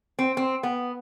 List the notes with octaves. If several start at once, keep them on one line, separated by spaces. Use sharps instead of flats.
C4
C4
B3